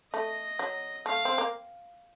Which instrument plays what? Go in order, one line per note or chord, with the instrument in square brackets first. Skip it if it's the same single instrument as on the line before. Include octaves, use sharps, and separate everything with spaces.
[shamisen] A3 [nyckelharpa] D#5
[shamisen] F#3
[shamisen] A3 [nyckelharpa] F5
[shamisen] C4
A#3